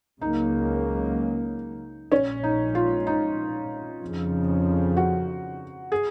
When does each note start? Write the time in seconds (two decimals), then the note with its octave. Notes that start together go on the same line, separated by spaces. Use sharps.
0.21 C#2 C#3 F#3 A#3 D#4
2.12 A#1 A#2 G#3 C#4
2.43 D#4
2.75 F4
3.07 D#4
4.01 F2 C#3 F3
4.97 F#4
5.92 G#4